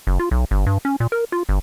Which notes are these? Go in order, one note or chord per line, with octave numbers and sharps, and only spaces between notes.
F#1
F4
B1
G1
G2
C#4
A#2
A#4
F4
G1